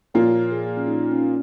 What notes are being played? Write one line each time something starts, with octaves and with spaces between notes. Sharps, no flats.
A#2 F3 A#3 F4 C#5
G#4
C#4
D#4
C#4